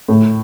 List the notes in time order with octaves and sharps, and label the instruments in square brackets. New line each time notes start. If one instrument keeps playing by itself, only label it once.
[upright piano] A2